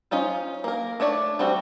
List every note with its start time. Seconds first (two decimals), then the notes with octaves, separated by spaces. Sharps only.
0.11 C#4 D#4 F4 C5
0.64 A#3 A#4
1.00 A3 D4 C#5 D5
1.39 G3 C4 F#4 A4